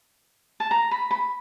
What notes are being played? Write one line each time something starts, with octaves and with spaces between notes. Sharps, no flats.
A5
A#5
B5
B5